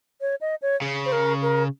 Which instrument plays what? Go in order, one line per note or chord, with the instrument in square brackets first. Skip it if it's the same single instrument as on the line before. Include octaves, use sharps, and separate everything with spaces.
[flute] C#5
D#5
C#5
[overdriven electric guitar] C#3
[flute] C5
A#4
A#4